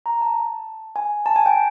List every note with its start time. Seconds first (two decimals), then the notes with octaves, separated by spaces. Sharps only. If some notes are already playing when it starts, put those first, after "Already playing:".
0.06 A#5
0.21 A5
0.96 G#5
1.26 A5
1.36 G#5
1.46 G5